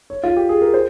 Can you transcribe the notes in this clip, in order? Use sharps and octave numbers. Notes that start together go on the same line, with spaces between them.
C#5
F4
G4
G#4
A#4
C5